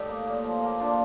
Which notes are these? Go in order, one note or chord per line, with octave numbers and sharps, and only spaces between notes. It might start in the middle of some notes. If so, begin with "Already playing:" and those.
Already playing: A2 G3 D#4 G4
A#3
A#2
F3
A#3
A#2 D4 F4